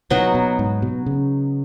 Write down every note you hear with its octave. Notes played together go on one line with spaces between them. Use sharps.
B2 F#3 B3 D#4 F#4
B2
G#2
B2
C#3